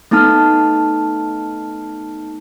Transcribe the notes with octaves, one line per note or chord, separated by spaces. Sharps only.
A3 B3 D#4 A5 F6